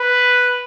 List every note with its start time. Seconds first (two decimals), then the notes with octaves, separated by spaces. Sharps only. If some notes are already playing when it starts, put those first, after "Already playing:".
Already playing: B4